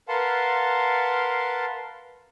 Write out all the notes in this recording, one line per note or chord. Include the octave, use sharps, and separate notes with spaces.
A#4 B4 F5 F#5 A5 C6